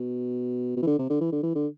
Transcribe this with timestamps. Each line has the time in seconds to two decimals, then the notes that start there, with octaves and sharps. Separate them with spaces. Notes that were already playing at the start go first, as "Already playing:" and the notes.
Already playing: B2
0.76 B2
0.82 E3
0.87 D3
0.99 C3
1.10 D3
1.21 E3
1.32 D3
1.43 E3
1.55 D3